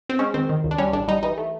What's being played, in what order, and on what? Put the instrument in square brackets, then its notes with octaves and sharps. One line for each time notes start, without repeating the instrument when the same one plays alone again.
[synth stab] C4
G#3 C#4
D#3 C4
D#3
C#2
D4
G3 C#4
A1 D4
G3 D#4
E3 D#4
A3